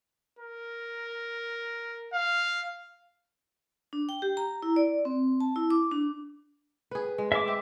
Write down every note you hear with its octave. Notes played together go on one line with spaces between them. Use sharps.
A#4
F5
D4
G5
G4
A#5
E4
D5
C4
A5
E4
D6
D4
G#4 B4
G#3
G#3 E5 D6
C4